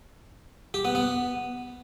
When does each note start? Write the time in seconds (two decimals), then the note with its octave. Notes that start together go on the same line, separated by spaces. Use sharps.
0.74 G4
0.85 B3
0.95 B3